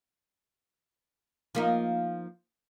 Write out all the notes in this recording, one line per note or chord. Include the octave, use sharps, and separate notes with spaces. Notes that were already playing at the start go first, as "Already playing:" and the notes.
F3 A#3 D#4